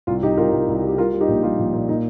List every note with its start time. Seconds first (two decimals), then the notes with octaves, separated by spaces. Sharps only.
0.07 C2 F4
0.22 C2 D#4 G4
0.37 C2 F4 A#4
0.52 C2
0.68 C2
0.83 G3
0.88 G4
0.98 G3 F4 A#4
1.13 G3
1.21 D#4 G4
1.28 A#1
1.43 G3 F4
1.59 A#1
1.73 A#2
1.89 A#2 D#4